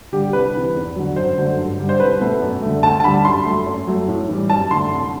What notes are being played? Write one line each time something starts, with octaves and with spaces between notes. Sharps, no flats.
D3 G3 G4
C2 B4
C3 E3
E2
D3 F#3
F#2 C5
D3 F#3 A3
G2
D3 G3
C5
C2 B4
B2 A3
F#2
D3 A3
D2 A5
A5
D3 G3 B5
F#2 C6
F#3 A3
F#2
F#3 A3
A2
E3 G3
F#2 A5
D3 A3 C6
C2